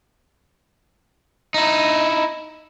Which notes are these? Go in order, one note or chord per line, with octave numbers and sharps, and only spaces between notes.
D#4 E4